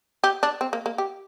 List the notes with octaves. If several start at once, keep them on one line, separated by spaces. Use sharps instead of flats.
G4
D4
C4
A#3
A#3
G4